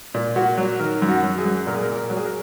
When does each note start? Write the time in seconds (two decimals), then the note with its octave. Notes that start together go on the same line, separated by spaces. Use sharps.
0.14 A#2
0.36 A#2 F#4
0.57 F#3
0.79 D#3 A#4
1.02 F#2
1.08 F#4
1.23 F#3
1.38 G#4
1.45 F#2
1.66 A#2 A#4
1.75 G#4
1.83 A#4
1.89 A#2
1.95 A#4
2.10 F#3
2.17 G#4
2.25 A#4